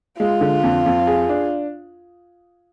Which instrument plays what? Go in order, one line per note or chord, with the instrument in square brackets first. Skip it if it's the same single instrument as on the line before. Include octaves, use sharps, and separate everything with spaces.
[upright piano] G#3 [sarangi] F4
[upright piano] D3
F2
F2
G#4
D4